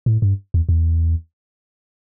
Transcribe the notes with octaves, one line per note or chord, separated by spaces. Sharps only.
A2
G2
E2
E2